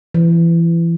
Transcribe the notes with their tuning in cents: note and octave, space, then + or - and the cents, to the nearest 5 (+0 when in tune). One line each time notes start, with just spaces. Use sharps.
E3 +30